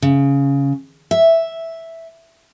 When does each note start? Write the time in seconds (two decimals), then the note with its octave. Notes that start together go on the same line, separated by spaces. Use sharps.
0.02 C#3
1.11 E5